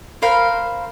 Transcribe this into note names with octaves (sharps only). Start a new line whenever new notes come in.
A#4 C5 F5 B5